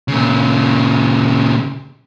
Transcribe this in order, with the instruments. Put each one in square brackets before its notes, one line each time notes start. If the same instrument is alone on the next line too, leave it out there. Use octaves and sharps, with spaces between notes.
[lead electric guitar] A#2 C#3